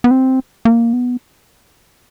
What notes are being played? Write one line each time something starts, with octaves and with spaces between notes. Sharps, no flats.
B3
C4
A#3
B3